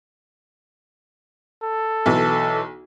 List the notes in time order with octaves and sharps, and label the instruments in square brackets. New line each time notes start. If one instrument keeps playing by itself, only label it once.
[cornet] A4
[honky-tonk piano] B1 E3